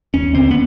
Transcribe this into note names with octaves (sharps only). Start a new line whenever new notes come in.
D#2 C#4
D3 C4
B3